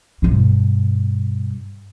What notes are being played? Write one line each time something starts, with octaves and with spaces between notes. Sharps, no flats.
G2 B2